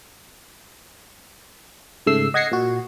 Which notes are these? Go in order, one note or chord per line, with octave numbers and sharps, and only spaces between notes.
G#2 C#3 A3 E6 C7
D#5 F#5 G#6 A#6 C7 C#7
A#2 F#4